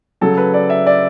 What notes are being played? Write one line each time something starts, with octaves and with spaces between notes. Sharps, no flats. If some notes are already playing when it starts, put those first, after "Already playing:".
C#3 F#3 A3 A4
B4
D5
E5
D5